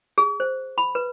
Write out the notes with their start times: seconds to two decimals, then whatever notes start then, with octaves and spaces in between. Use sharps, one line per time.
0.18 G#4
0.40 C5
0.78 B5
0.95 B4